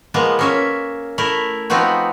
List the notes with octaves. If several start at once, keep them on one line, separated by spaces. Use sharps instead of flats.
F3 G#3 A#3 B3
A#3 C#4 E5
A3 E4 A#4
F3 B3 C4 D#4 F#4